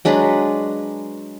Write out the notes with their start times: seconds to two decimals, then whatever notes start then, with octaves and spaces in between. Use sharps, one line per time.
0.05 F#3 G#3 D4 B4